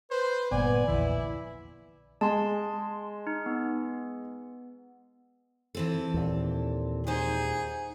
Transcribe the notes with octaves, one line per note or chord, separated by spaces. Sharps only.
B4 C5
G1 A#2 B3 D5 G#5
A#1 E2 D3 E3 E4
G#3 A5 C6
D#4
B3
E3 C4 A4
D#2 A#2
D#4 G#4 C5 F#5